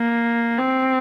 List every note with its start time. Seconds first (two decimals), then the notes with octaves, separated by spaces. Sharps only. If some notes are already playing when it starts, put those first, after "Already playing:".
Already playing: A#3
0.59 C4